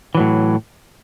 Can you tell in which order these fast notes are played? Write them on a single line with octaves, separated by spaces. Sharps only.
E3 F#3 A2